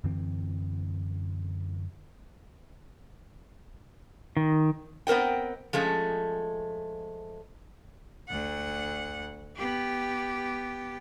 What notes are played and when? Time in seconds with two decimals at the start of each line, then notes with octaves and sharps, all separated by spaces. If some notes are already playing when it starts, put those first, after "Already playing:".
0.04 F#2 D3 E3 C4
4.37 D#3
5.07 B3 C4 A#4 D#5 G5
5.73 F3 G#3 A3 C#4
8.28 D2 F#5
9.56 B3 G4